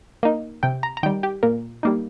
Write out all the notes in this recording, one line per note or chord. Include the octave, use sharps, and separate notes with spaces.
A#3 D#4
C3 G5
A#5
A#5
D#3 G3 G5
G4
A#2 A#4
G3 A#3 D#4